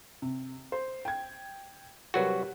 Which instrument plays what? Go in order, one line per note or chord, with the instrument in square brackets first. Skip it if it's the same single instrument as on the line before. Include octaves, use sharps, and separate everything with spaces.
[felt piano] C3
C5
G5 G#6
[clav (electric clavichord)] C2 F#3 F#4 [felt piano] G4 A#4 B4